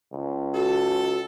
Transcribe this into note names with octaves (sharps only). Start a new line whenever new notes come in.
C#2
F#4 A4